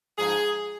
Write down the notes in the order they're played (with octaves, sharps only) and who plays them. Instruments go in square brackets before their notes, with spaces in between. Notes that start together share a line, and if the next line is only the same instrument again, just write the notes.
[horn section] G#2 F3 G#4